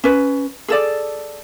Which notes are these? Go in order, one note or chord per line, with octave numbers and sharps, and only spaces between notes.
C#4 B4
G#4 A4 D5